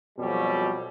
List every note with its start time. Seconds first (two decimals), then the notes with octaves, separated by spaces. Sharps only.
0.18 F2 B2 F#3 G3